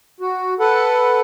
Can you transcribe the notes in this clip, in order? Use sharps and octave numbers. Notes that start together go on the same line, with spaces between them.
F#4
A4 B4 F#5